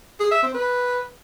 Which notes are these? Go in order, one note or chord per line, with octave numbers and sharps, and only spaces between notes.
G#4
E5
C4
B4